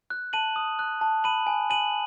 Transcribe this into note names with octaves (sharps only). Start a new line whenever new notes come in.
F#6
A5 D#7 F#7
D#6
F#6
A5
B5 D#7 F#7
G#5
G#5 D#7 F#7